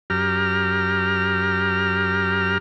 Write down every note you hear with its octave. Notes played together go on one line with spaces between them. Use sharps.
F#2 G4 A#5 F6